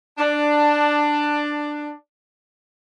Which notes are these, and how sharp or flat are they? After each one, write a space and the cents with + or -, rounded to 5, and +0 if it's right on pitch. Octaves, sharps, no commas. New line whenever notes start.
D4 +10